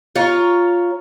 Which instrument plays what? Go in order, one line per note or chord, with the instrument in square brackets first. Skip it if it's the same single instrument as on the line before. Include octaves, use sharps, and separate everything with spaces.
[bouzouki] F4 C#5 A#5